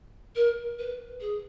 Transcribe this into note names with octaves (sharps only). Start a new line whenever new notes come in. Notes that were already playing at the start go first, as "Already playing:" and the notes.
A#4
B4
G#4